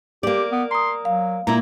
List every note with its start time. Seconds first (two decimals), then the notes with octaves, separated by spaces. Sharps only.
0.23 A#3 G4 D5
0.52 B3
0.71 A#5 C6 D#6
1.05 F#3 F5
1.47 A#2 A#3 E4 A#5